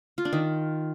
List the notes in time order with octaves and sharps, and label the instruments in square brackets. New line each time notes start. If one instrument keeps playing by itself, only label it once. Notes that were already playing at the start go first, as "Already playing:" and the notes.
[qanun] F4
D4
D#3